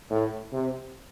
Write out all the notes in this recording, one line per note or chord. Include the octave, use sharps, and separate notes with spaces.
A2
C3